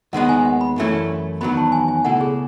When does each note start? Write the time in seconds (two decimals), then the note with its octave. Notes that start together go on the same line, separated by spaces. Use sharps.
0.13 D#2 D#3 G#3 B3 D#4 F#5
0.29 G#5
0.45 F#5
0.61 B5
0.78 F#2 E3 A3 C#4 E4
1.41 E2 D#3 F#3 B3 B5
1.57 A5
1.72 G#5
1.88 G#5
2.05 C#2 B2 A3 E4 F#5
2.21 G#4